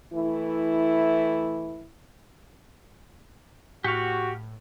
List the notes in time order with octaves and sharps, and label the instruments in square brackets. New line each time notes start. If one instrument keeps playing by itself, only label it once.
[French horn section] E3 A3 E4
[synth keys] A2 [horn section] F#4 [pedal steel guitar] G4 F5